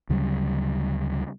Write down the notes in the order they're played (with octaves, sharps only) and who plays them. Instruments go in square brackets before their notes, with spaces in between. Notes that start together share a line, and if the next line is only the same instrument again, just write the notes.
[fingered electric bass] D2 C#3 F#3 G3